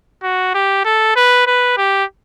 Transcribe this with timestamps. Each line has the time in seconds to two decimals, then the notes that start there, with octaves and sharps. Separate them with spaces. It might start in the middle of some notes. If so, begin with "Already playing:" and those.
0.23 F#4
0.54 G4
0.85 A4
1.16 B4
1.47 B4
1.78 G4